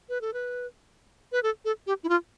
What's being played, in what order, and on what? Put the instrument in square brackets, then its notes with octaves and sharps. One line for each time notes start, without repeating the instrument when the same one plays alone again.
[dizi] B4
A4
B4
B4
A4
A4
G4
E4
F4